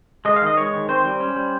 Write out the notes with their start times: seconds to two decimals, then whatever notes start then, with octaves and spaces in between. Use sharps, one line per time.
0.25 G#3 D#5
0.36 F5
0.42 D#3
0.47 D#5
0.57 G#3 C#5
0.73 D#3
0.89 C4 C5
1.05 G3
1.20 C#4
1.36 G3